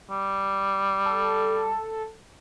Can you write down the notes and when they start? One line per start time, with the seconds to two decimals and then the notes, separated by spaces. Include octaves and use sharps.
0.10 G3
1.06 A4